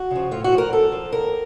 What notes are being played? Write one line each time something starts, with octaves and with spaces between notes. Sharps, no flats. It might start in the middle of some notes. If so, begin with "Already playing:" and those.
Already playing: F#4
C#3 F3
A2 F4
F#4
F3
A#4
F#2 A4
F3
D#2 A#4